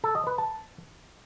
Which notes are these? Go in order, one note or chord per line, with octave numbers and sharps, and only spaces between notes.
A4
D#5
B4
A5